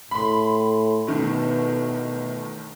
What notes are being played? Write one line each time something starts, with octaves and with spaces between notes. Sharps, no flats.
A2 B5 C6
G1 B2 D#3 A3